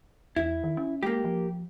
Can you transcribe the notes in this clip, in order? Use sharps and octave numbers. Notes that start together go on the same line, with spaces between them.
E2 E4
D#3
C#4
G#3 A#3 G4
F3